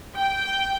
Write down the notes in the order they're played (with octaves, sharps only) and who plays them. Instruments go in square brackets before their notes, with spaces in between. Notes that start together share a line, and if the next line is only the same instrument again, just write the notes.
[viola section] G5